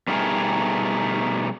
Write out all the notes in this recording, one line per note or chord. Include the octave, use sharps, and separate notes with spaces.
B2 G3 A3 D#4 G#4 A#4